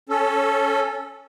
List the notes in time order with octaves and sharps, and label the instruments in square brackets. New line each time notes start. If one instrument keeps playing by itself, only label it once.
[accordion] C#4 A4